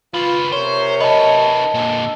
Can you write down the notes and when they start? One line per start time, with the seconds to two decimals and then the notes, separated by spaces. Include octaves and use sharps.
0.14 C#3 F4 B4
0.52 C3 A#4 C5 C#5
1.01 D#4 B4 D#5 A5
1.74 A#2 D3